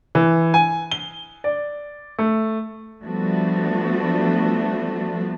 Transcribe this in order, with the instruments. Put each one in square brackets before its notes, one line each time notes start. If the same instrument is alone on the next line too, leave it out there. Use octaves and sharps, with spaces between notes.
[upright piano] E3
G#5
G7
D5
A3
[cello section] F3 G3 A3 B3 D4 F#4